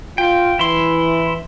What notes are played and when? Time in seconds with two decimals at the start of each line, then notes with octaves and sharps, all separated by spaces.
0.18 F4 G5
0.59 E3 E4 C6